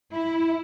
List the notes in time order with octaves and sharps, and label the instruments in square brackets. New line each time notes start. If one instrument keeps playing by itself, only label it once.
[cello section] E4